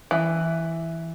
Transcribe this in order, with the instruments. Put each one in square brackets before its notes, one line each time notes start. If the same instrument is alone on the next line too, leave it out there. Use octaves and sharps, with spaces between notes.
[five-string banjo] E3